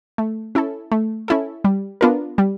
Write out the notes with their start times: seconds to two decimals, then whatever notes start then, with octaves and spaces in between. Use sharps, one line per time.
0.18 A3
0.55 C#4 E4 A4
0.91 A3
1.28 C#4 E4 A4
1.64 G3
2.01 B3 D4 F4 A#4
2.38 G3